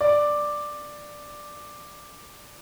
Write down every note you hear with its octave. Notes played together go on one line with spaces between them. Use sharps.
D5